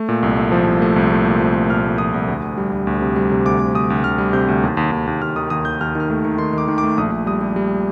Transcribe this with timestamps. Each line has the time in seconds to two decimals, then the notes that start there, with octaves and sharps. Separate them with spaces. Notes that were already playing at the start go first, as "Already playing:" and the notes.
Already playing: A3
0.09 A#2
0.23 C2
0.37 A3
0.52 F3
0.67 C2
0.82 A3
0.96 C2
1.11 A3
1.25 A#2
1.40 F3
1.55 A3
1.70 A#2 F6
1.84 A3
1.98 F3 D#6
2.14 C2
2.28 D2
2.43 D2
2.58 G3
2.73 D2
2.87 D2
3.02 C3
3.16 G3
3.32 C3
3.46 D2 D6
3.60 D2
3.74 D2 D#6
3.90 D2
4.04 D2 F6
4.18 G3
4.33 C3 G6
4.48 D2
4.64 D#2
4.77 D#2
4.92 D#2
5.07 D#2
5.22 D#2 F6
5.36 D#3 D#6
5.50 D#2 D#6
5.65 D#2 G6
5.81 D#2 F6
5.95 D#3 F6
6.10 A3
6.25 D#3
6.38 D#3 C6
6.53 D#3 D6
6.68 D#3
6.78 D6
6.84 A3
6.97 A#1 D#6
7.12 A#1
7.26 G3 D#6
7.41 G3
7.56 G3